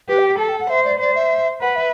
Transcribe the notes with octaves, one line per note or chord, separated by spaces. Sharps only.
G4 B4
G5
G5
A4 A5
G5
F#5
C5 E5
D5
C5 D5
E5
B4 F#5
E5